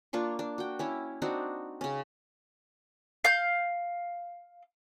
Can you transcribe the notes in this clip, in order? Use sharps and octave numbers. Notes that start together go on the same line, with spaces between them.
A#3 D4 F4 C#6
D4
F#4 G5
C#4 E4 C#5
C4 D4 D#4 F#4
C#3 C#4
F5 G6